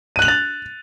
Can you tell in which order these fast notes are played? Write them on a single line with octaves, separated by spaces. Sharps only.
D#7 F#6 F#7 F7 A6